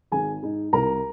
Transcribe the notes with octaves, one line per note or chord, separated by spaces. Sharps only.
G#1 G#4 G#5
G#2 G#3 D#4
C2 A#4 A#5